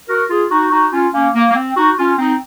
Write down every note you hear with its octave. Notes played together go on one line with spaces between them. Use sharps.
F#4 A#4
F4 G#4
D#4 F#4
D#4 F#4
C#4 F4
A#3 C#4
A#3
A#3
C4
D#4 F#4
C#4 F4
C4 D#4